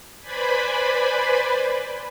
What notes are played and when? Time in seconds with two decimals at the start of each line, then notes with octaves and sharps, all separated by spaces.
0.21 B4 C5 D5 G#5 B5